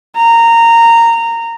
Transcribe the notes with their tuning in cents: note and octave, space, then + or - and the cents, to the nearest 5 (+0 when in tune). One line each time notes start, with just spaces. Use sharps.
A#5 -15